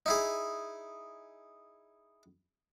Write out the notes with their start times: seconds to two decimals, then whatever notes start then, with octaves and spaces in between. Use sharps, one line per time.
0.06 D#4 E4 G#4